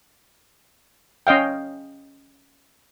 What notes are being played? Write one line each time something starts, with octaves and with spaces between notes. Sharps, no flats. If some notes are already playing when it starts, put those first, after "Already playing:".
C#4 D#5 F5 G5